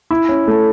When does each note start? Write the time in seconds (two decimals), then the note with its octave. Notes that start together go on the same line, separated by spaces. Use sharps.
0.11 E4
0.29 C#4
0.47 A3